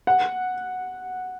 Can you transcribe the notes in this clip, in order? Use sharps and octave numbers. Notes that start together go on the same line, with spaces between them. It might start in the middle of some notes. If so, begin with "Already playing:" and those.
F#5